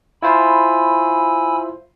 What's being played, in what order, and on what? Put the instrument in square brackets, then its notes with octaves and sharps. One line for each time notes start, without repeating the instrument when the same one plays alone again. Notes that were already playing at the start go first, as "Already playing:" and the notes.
[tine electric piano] E4 F4 C5 [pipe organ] G#5 B5 E6